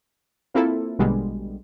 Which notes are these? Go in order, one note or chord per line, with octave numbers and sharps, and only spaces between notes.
A#3 C4 E4 F4 A4
A#1 B2 D3 G3 G#3